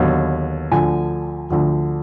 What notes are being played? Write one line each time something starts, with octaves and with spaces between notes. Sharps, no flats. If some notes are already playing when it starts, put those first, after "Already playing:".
Already playing: D#2 D3 F#3 B3
D2 D3 F3 G#5
D2 D3 F3